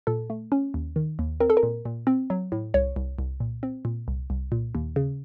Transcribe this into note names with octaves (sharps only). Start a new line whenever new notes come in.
A#2 A4
A3
C#4
D#2
D#3
D#2
C4 A#4
A4
A#4
A#2
A#2
C4
F#3
A2
C2 C#5
C2
C2
A#2
C4
A#2
C2
C2
A#2
D#2
C#3